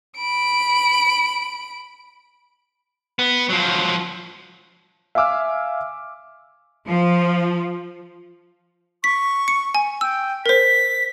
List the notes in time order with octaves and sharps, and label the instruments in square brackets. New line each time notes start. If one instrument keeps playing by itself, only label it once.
[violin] B5 D7
[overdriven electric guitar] B3
F3 F#3
[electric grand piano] E5 F5 G#5 D6 E6 F6
[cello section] F3
[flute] C#6 [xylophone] B6
[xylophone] C#7
G#5
[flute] G5 [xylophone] E6
[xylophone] A#4 C5 [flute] B6